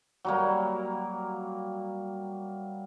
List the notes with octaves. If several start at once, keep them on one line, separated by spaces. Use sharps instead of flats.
F#3 G3 A#3